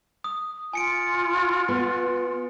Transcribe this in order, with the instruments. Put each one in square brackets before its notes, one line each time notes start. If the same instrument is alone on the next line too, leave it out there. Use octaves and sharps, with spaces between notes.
[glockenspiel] D#6
[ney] F4 [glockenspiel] G#5 C#7 D7
[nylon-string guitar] B3